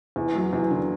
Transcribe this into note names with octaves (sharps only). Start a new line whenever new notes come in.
E2
F#3
E2
D3